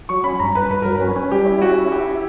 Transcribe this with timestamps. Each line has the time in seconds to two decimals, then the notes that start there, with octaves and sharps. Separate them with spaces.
0.09 F#3 C#6
0.24 C#4 B5
0.39 G2 A#5
0.55 G2 B4
0.70 G2 B4
0.82 F#3 A#4
0.95 B4
1.01 C#4
1.16 C#4
1.32 G3 G4
1.46 E4
1.62 C#4 F#4
1.77 E4
1.92 E4 G4
2.07 E4